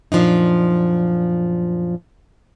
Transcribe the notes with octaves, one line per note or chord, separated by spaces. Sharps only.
F#2 A#2 F3 D4 D#4